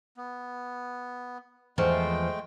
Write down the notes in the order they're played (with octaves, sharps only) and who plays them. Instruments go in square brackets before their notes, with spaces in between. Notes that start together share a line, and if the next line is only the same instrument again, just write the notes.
[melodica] B3
[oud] E2 F3 [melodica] G#3 A3 G5